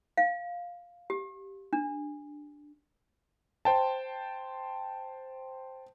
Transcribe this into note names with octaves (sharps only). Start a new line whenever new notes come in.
F5
G4
D4
C5 G5 A5